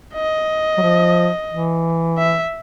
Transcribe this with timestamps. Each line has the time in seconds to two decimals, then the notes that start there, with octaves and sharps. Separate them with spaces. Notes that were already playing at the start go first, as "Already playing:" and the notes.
0.15 D#5
0.78 F#3
0.82 F3
1.50 E3
2.18 E5